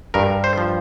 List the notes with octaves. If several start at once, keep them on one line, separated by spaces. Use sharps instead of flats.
G2 A#4
C5
F3